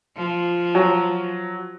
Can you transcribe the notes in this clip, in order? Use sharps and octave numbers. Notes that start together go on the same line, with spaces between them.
F3
F#3